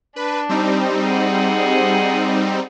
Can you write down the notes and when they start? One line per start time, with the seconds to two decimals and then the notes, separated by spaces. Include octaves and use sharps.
0.16 D4 B4
0.49 G3 C4 D#4
1.02 G#4 F#5